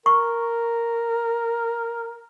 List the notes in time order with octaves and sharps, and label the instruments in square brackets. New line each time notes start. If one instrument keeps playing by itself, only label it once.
[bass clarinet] A#4 [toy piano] C#6